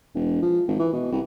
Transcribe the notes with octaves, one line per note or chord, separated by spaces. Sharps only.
E1
F3
G#1
E3
B2
C2